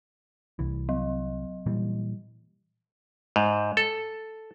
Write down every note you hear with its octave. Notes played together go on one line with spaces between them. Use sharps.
C2 E3
F#3
A#2 E3 G3
G#2
A4